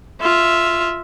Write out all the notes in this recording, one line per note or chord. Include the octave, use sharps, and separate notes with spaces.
F4 E5